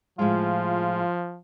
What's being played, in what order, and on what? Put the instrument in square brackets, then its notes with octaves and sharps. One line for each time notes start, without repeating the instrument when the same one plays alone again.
[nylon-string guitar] A2 G#3 [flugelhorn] F3 [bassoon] F4